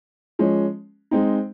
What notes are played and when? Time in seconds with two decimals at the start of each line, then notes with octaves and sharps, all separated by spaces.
0.39 F3 G#3 C#4
1.11 G#3 C4 D#4